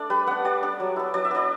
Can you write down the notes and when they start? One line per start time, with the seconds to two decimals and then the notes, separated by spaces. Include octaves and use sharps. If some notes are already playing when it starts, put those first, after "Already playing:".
Already playing: A3 D4 D5
0.10 G3 B4
0.27 B3 D4 F#5
0.45 G3 D5
0.63 B3 D4
0.80 F#3
0.96 B3 E4
1.14 F#3 D5
1.25 E5
1.31 B3 E4 D5